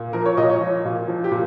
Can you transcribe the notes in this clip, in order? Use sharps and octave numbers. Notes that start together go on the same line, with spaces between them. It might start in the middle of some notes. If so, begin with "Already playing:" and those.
Already playing: A#2
F3 A#4
C#5
A#2 D#5
C#5
F3
A#2
F3
G4
A#2